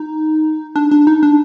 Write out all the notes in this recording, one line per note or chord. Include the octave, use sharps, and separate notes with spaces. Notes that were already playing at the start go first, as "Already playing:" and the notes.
Already playing: D#4
D4
D4
D#4
D4